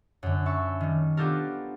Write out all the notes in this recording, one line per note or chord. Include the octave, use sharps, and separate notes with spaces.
F#2 D3
E5 A5 C#6
D#3 G3
B3 D4 F4 G4 A4 A#4